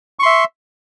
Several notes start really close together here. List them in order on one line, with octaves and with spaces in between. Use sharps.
C#6 C6 E5